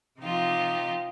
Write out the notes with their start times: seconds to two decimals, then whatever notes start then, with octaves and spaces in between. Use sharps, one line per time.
0.20 C3 F3 D#4 F4 G4